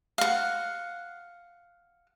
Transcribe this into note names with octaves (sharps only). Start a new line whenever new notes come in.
F5 F#5